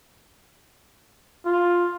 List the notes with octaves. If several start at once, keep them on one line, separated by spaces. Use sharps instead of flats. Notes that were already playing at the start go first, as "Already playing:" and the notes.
F4